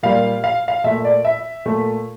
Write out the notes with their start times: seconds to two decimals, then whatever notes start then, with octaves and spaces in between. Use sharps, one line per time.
0.03 A#2 G3 A#3 F5
0.44 F5
0.68 F5
0.84 A#2 A3 E5
1.05 D5
1.25 E5
1.66 A#2 A3